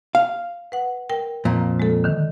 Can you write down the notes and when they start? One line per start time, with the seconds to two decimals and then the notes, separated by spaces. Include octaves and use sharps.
0.15 F5
0.72 B4 F#5
1.10 A#4 G5
1.45 F2 A#2
1.80 G#3 A4
2.04 D3 D#3